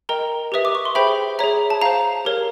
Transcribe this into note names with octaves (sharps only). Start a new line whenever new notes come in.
A#4 D#5 G5 A#5
G4 B4 E5 D#6
D6
C#6
C6
G#4 C5 E5 G5 B5
G#4 C#5 E5 A#5
A5
C5 F5 A#5
G4 A#4 C#5